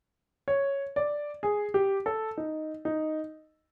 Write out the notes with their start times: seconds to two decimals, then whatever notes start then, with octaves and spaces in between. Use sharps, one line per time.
0.48 C#5
0.96 D5
1.43 G#4
1.74 G4
2.06 A4
2.37 D#4
2.85 D#4